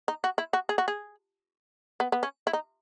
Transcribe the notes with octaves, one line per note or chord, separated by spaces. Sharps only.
D#4
F#4
E4
F#4
G#4
F#4
G#4
B3
B3
C#4
E4
D#4